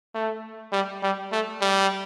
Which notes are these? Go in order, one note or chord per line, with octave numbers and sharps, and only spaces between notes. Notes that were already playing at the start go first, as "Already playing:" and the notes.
A3
G3
G3
A3
G3